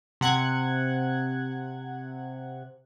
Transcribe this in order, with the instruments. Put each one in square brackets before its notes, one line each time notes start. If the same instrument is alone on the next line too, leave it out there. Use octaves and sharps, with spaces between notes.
[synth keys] C3 F#5 F#6 G#6